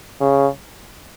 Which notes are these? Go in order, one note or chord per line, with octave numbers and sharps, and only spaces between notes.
C#3